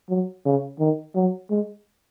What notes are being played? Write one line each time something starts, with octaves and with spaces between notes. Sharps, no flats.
F#3
C#3
D#3
F#3
G#3